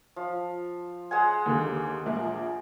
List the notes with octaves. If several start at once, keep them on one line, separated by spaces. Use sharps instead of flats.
F3
G#3 F#5 G#5
D#2 D3 A#3
A#1 A#3